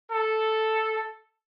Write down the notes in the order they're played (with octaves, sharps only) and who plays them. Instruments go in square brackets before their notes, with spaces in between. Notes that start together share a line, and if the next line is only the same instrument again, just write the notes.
[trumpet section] A4